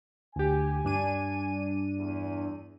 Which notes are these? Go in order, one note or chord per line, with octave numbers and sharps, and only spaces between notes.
D2 G4 G#5
G2 D4 D#7
E2